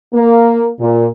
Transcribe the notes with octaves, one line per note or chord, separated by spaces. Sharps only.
A#3
A#2